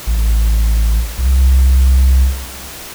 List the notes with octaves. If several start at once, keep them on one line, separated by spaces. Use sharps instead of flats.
A1
C2